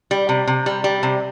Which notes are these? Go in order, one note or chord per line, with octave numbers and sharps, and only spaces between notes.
G3
C3
C3
G3
G3
C3